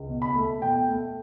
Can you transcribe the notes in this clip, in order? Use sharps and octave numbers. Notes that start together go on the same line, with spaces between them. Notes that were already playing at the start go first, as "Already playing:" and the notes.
Already playing: C#2
B2
B5
A3
B2 G5
A3